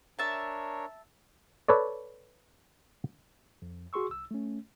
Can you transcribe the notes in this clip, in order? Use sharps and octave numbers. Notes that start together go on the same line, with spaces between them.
D4 A#4 C#5 E5 A5
A4 B4 C#5 D5
F2
F#4 G#4 C6 C#6 E6
C2 E6
A3 C#4